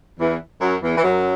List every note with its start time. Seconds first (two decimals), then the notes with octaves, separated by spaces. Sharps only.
0.20 E2 E3
0.61 F#2 F#3
0.82 E2 E3
0.97 E3
1.04 F#2 F#3